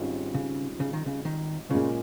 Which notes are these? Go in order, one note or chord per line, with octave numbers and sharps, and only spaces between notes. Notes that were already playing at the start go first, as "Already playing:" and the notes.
Already playing: G#1 G#2 G3 C#4 F4
C#3
C#3
D#3
C#3
D#3
A#2 C#3 G#3 C#4 F4